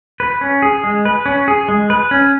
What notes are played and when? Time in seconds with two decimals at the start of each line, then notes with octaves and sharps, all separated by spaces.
0.20 B4
0.41 C#4
0.62 G#4
0.84 G#3
1.05 B4
1.26 C#4
1.48 G#4
1.68 G#3
1.90 B4
2.11 C#4